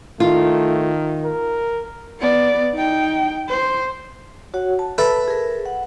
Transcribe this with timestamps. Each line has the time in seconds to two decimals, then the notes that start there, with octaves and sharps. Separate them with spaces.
0.20 D#3 A3 F4
1.25 A#4
2.20 B3 D5
2.74 D#4 G5
3.49 C5
4.54 F#4 C#5 F#5
4.79 A5
4.98 A4 B4 E5
5.28 G#4 A#4
5.66 F#5